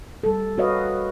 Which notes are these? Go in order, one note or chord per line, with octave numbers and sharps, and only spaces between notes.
G3 A4
F#4 A#4 B4 C#5 D#5 F5